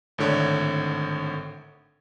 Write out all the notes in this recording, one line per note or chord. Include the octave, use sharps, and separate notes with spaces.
G#1 A2 D3 C#5 G#6